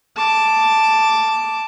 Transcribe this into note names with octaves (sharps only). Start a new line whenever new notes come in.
A5 D6